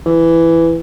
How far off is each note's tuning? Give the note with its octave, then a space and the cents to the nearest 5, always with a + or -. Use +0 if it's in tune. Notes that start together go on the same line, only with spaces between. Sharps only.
E3 +10